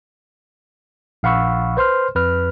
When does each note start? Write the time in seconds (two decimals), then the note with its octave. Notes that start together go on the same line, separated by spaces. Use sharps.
1.23 A#1 F5 F#5 B5 C#6 E6
1.77 B4 C5 C6 F6
2.15 F2 B4 F6